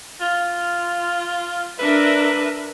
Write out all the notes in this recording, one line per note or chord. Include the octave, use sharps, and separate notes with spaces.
F4
D4 A#4 B4 E5